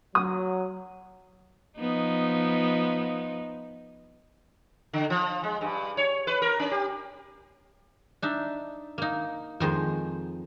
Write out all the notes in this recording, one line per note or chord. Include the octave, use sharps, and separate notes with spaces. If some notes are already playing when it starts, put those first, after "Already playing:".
F#3 D#6
F3 B3 D#4
D3
F3
G#3
G2
C#5
B4
A#4
C#4
G4
D4 D#4 E5
A#3 D#4
F2 D#3 G#3 C5